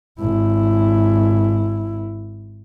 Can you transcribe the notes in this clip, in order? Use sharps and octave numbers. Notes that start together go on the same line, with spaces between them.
G#1 E4